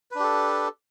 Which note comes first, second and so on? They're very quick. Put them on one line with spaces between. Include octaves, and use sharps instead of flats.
B4 D4 G4 A4